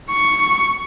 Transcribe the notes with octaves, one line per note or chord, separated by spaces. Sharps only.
C#6